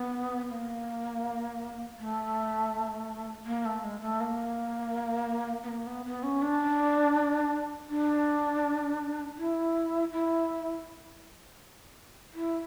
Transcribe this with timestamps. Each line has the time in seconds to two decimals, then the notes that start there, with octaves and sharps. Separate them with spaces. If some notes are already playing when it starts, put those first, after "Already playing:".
Already playing: B3
0.50 A#3
1.99 A3
3.46 A#3
3.65 A3
3.84 G#3
4.01 A3
4.21 A#3
5.63 B3
5.68 A#3
5.87 B3
6.06 B3
6.23 C#4
6.42 D4
7.90 D4
9.38 E4
10.12 E4
12.34 E4